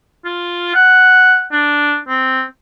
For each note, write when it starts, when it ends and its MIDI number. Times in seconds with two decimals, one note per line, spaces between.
0.25 0.69 65
0.74 1.44 78
1.52 1.97 62
2.08 2.43 60